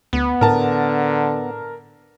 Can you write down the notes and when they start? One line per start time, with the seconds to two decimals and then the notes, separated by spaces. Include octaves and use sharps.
0.13 D2 B3
0.41 A2 D3 A#4 A5